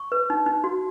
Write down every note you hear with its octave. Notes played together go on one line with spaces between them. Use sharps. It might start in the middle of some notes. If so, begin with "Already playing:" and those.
Already playing: C#6
B4
D#4
D#4
F#4